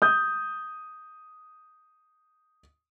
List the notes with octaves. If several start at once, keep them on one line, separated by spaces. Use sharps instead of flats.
D#6 G6